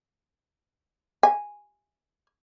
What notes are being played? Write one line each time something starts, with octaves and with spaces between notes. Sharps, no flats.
G#5